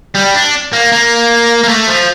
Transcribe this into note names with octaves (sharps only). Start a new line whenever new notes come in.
G3
D4
A#3
A#3
A#3
A3
F3